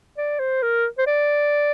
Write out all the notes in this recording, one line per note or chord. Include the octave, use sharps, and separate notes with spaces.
D5
C5
A#4
C5
D5